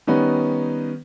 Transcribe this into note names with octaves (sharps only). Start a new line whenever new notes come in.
D#3 G3 B3 C#4 D#4 B4